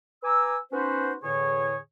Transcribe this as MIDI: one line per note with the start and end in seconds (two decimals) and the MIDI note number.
0.23 0.57 71
0.23 0.57 80
0.23 0.57 82
0.23 0.57 86
0.23 0.57 88
0.72 1.14 59
0.72 1.14 61
0.72 1.14 63
0.72 1.14 66
0.72 1.14 71
0.72 1.14 72
1.23 1.77 40
1.23 1.77 45
1.23 1.77 50
1.23 1.77 68
1.23 1.77 73